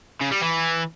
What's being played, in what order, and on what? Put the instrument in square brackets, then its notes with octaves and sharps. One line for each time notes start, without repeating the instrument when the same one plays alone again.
[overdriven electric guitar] C#3
G3
E3